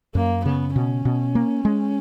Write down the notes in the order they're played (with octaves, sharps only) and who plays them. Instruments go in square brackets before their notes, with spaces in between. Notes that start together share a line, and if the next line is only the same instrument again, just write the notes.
[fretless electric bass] F#2 [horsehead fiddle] A#3
[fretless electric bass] C#3 [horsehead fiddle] B3
[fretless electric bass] B2 [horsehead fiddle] C#4
[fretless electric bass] B2
A#3
G#3